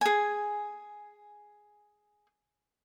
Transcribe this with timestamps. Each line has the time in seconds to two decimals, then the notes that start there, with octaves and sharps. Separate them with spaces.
0.01 G#4 G#5